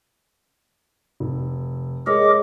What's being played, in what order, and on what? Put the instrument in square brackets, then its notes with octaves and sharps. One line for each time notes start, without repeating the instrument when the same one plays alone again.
[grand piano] F1
[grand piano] G#3 C#5 [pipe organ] G#4 A#4 D#5 [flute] D6